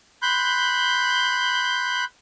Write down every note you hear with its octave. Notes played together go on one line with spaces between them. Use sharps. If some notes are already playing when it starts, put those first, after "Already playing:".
B5 C6 F#6 G6